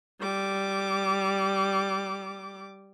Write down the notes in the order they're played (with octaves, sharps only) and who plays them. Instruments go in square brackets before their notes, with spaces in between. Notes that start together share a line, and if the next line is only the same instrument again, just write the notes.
[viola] G3 D6